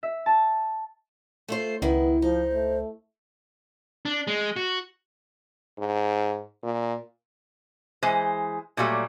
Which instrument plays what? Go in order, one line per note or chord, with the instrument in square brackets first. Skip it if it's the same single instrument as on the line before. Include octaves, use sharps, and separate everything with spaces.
[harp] E5
A5
[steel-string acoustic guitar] A3 F4 C5
[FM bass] C#2 [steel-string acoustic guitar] D#3 E4 [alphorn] B3
[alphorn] F3 [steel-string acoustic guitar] D#4 [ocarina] C5
[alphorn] A3
[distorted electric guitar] D4
G#3
F#4
[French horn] G#2
A#2
[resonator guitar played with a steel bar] E3 G#3 C5
A#2 F#3 G3 A3